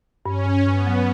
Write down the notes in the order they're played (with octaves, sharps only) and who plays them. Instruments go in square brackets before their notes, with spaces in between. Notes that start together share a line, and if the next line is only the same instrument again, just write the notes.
[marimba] G2 [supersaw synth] C#4
[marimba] G2
[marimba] G2 [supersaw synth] B3
[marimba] F#3